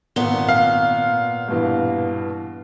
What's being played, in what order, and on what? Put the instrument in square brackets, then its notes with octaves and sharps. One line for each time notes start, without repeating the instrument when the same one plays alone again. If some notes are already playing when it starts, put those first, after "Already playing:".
[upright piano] G#1 G7 [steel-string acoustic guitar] A#2 B3
[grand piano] F5
[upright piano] G2 B2 E3